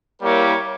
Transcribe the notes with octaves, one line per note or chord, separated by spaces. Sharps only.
G3 A#3 E4 G4 A#4 C#5